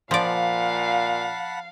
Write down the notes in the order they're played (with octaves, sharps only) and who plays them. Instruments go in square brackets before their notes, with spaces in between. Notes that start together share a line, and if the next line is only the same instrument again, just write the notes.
[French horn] A#2 [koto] F3 D5 [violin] F5 [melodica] F#5 A5 B5